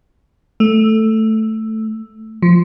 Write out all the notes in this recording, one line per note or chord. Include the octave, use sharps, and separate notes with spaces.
A3
F3